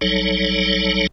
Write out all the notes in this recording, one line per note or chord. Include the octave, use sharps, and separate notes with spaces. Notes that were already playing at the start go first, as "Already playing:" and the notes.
A1 F#3 G3 D#4 A4 C#5